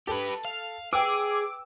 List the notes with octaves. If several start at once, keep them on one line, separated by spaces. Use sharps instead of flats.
G4 A4 B4
F5
G#4 B4 G5 D6 E6